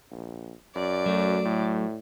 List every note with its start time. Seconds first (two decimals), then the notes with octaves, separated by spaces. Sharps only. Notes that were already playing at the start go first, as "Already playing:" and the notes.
0.11 A#1
0.75 F#2 D5
1.06 F#3 A3
1.45 A2